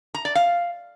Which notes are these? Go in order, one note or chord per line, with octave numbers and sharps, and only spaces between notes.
A#5
D5
F5